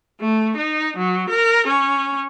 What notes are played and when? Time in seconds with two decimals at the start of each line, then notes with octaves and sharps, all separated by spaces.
0.20 A3
0.56 D#4
0.97 F#3
1.29 A#4
1.67 C#4